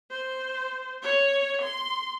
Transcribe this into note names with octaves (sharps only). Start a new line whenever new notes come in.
C5
C#5
C6